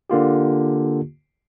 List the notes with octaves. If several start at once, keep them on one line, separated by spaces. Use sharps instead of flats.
D3 A#3 F4 G4